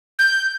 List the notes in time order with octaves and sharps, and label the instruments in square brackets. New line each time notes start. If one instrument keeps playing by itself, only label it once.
[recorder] G6